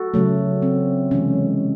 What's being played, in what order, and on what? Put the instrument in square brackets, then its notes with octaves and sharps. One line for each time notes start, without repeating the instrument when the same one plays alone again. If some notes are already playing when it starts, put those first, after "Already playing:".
Already playing: [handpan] F#4 A4
C#3 F#3 A3
C4
C3 E3 G#3 C#4